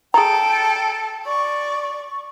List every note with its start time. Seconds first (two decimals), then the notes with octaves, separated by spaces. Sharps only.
0.14 G#4 A4 G5 A#5
1.26 D5 C#6